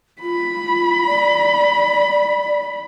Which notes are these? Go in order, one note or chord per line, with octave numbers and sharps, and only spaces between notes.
F4 B5
D5